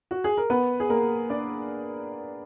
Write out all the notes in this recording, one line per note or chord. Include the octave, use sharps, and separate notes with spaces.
F#4
G#4
A#4
B3 B4
G#4
A#3 A#4
D4 D5